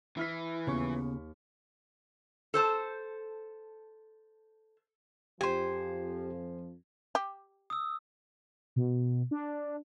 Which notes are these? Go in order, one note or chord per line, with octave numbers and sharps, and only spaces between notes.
E3 E4 F6 B6
D#2 C#3 B3 C#6
A4 C5 A5
F2 F3 G4 C5 G#5
G4
D#6 E6
B2
D4